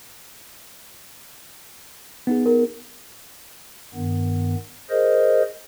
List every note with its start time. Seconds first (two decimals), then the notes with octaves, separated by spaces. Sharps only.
2.27 B3 D#4 G#4
2.46 A#4
3.95 G2 D#3 B3
4.90 G#4 A#4 C5 D#5